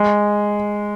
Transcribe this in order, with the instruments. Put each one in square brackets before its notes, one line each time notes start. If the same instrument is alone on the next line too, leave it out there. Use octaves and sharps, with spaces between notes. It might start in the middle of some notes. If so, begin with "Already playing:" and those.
Already playing: [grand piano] G#3